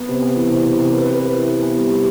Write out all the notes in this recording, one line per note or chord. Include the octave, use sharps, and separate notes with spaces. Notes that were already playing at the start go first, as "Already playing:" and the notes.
Already playing: B3
C3
B3
E3
C3
C3
C3
B4
B4
B4
E4
E4
B3
G3
G3